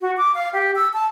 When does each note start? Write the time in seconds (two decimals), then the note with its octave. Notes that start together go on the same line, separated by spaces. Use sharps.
0.01 F#4
0.17 D6
0.35 F5
0.53 G4
0.76 E6
0.93 A5